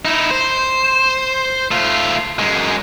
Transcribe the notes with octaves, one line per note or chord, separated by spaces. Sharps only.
D#4 E4
C5
A3 F4
F#2 G#3